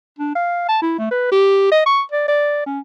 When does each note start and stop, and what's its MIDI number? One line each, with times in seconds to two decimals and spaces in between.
0.19 0.33 62
0.35 0.64 77
0.68 0.79 81
0.82 0.95 64
0.99 1.11 57
1.11 1.31 71
1.32 1.66 67
1.71 1.83 75
1.86 2.02 85
2.12 2.26 74
2.28 2.64 74
2.66 2.79 61